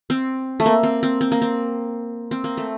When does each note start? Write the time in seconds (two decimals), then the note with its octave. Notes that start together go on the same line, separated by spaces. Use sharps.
0.10 C4
0.60 A3
0.66 A#3
0.83 C4
1.03 C4
1.21 C4
1.32 A#3
1.42 C4
2.31 C4
2.44 A#3
2.57 A3